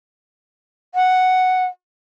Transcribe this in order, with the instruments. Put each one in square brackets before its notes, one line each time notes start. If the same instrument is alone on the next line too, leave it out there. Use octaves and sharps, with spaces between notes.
[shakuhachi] F#5